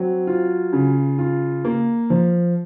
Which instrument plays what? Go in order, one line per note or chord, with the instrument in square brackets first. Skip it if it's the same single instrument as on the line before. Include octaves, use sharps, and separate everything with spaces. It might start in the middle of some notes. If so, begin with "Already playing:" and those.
Already playing: [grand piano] F#3 C4
F4
C#3
F4
A#3
F3